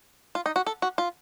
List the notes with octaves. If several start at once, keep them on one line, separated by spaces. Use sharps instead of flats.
F4
D#4
F#4
A4
F#4
F4